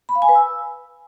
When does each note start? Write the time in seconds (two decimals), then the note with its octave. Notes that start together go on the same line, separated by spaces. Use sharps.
0.09 B5
0.15 F5
0.22 G#5
0.29 B4
0.35 E6